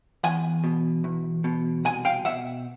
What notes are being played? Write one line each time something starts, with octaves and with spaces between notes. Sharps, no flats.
E2 F#5 G#5
B2
E2
B2
C2 F#5 G#5
F5 G5
B2 E5 F#5